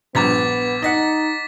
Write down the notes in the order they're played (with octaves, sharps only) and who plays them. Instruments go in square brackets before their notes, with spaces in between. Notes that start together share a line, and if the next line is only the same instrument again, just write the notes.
[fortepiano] A#1 G2 A#5 [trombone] B3 [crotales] D6 A6 B6
[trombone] D#4 [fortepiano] D#5 F#5 [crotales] D6 B6